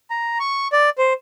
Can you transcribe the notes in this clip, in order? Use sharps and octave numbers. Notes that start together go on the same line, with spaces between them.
A#5
C#6
D5
C5